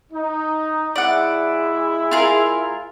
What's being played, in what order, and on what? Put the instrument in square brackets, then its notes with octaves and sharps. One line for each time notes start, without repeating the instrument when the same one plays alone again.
[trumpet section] D#4
[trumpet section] G#3 E4 E5 [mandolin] D5 F#5
[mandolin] F4 G#4 A#4